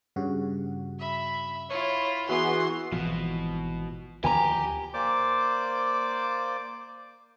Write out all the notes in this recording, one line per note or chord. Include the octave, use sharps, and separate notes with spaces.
G2 C#3 F#4
E5 B5
E4 F4 C#5
E3 B3 E4 F#4 G#4 C6
G#1 B2 E3 F3
D2 D#3 F3 G4 G5 G#5 A#5
A#3 C5 D5 D6